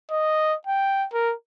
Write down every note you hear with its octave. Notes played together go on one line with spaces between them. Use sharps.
D#5
G5
A#4